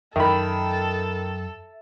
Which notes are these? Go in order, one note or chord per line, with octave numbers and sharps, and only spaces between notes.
F#2 D#3 A4 E5 B5